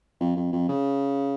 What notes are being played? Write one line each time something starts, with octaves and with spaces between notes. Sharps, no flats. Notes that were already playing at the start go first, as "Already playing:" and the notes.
F2
F2
F2
C#3